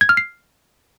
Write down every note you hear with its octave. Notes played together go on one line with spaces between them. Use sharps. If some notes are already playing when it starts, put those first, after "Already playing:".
G#6
F6
C7